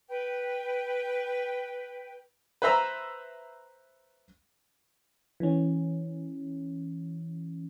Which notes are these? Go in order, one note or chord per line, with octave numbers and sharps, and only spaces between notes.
B4 G5
B4 C5 E5 A#5
E3 C#4